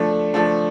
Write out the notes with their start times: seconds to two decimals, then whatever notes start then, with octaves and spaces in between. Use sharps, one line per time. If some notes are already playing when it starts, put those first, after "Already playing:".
Already playing: F3 A3 D4 A4
0.34 F3 A3 D4 A4